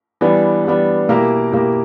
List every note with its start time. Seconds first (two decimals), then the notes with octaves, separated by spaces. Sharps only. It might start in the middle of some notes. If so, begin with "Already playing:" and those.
0.21 E3 G3 B3 D4
0.65 E3 G3 B3 D4
1.09 B2 A#3 E4 G4 A#4
1.52 B2 A#3 E4 G4 A#4